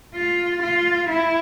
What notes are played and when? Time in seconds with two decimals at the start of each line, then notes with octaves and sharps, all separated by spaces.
0.15 F4
0.62 F4
1.09 E4